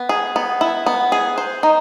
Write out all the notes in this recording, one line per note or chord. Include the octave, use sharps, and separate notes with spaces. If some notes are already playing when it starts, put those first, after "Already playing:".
Already playing: B3
G#4
B3
E4
B3
G#4
C5
D#4